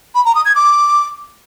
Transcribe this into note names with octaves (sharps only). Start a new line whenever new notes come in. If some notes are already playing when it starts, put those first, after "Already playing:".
B5
A#5
D#6
G#6
D6